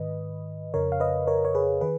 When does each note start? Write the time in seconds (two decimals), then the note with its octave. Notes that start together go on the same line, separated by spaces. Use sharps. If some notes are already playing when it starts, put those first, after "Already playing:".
Already playing: G#2 D#3 B4 D#5
0.74 F2 C#3 A#4 C#5
0.92 F5
1.00 B4 D#5
1.27 A#4 C#5
1.45 C#5
1.55 G#4 B4
1.81 D#3 G#4 B4